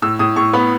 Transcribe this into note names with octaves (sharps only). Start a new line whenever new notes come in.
A2 E6
A2 D#6
A2 C#6
B3 B5